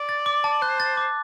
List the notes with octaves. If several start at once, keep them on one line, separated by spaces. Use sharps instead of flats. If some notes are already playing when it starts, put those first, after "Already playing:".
Already playing: D5
A6
D6
A5
C5 F#6
A6
D6